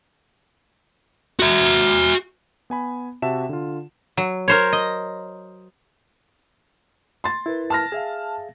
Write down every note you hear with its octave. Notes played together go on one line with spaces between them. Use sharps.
F#4 E5
B3 G#5 B5
C3 F#4 E5 A5 E7
D3 F4
F#3
A#4 C5 C#5
D#5
C6 A6
E4 A#4 B4
A5 F6 A#6
G#4 E5 F5